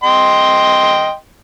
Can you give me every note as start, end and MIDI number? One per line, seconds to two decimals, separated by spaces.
0.04 1.14 75
0.04 1.14 79
0.04 1.14 84